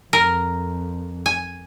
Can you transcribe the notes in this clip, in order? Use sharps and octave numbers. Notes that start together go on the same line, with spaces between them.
F2 A#4
G#5